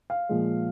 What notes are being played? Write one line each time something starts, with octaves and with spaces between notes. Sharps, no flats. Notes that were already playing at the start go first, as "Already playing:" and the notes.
F5
A#2 F3 G#3